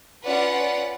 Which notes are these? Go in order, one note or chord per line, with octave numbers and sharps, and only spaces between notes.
C#4 F4 B4 D5 F#5